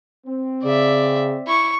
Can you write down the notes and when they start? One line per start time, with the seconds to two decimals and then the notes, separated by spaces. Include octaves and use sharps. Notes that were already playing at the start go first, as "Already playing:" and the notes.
0.25 C4
0.63 C#3 D5 E5
1.48 E4 C#6